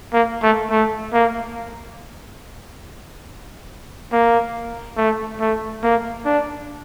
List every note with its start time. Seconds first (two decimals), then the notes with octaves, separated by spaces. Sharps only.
0.14 A#3
0.43 A3
0.71 A3
1.13 A#3
4.13 A#3
4.97 A3
5.40 A3
5.83 A#3
6.26 D4